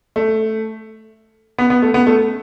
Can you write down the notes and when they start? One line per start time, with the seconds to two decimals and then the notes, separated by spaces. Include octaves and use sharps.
0.16 A3
1.58 B3
1.70 B3
1.82 A3
1.94 B3
2.07 A3